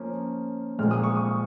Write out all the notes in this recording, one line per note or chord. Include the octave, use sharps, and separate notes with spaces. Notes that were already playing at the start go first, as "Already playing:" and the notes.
Already playing: F3 A#3 C#4
A#2 F3 G#3 F6
D#6
C#6
D#6